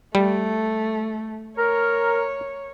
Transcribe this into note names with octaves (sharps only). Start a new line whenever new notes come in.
G3 A3
A#4 C#5